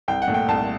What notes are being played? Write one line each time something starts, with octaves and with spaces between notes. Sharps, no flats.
C2 G5
F#5
A#2 A3
G5
C2 A5